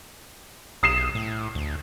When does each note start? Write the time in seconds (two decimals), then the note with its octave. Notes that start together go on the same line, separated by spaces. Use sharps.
0.83 B1 D#6 C7 E7
1.15 A2
1.55 D2